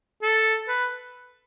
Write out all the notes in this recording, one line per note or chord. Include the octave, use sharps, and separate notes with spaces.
A4
B4